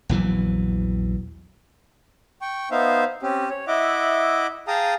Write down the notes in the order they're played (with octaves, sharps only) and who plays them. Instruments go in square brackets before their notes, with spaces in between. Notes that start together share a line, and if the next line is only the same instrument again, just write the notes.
[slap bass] A#1 E2 E3 F#3
[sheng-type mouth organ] G5 C#6
B3 D#4 C5 E5 F5
C4 C#4 G4
C#5
E4 D#5 E5 F#5 D6
G#4 F5 G5 A5 A#5 D#6